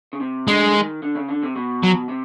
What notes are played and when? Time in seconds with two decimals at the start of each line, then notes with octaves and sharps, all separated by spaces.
0.13 C#3
0.21 C3
0.48 D3 G#3
0.75 D#3
1.02 D3
1.16 C#3
1.29 D3
1.43 C3
1.56 B2
1.83 F#3
2.09 C3